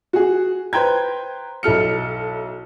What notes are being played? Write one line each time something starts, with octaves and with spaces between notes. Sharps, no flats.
F#4 G#4
B4 C5 G5 A#5 G#6
B1 E4 A4 F6 C#7